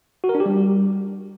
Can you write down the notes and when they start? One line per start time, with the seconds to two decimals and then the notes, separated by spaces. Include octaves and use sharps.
0.24 F#4
0.29 A#4
0.35 D4
0.40 G4
0.46 G3